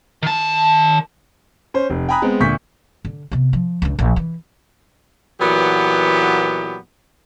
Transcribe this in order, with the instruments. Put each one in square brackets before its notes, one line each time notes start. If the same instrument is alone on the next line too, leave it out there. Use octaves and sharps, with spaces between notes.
[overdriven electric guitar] D#3 A5
[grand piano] C#4 C5
F1
G5 G#5 A#5 B5 D#6 F#6
G#3 B3 C4
D2 A#2 C#6 G6 B6
[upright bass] D3
C3 B3
F3
C#2 D4
A#1
E3
[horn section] A#2 E3 F#3 B3 G4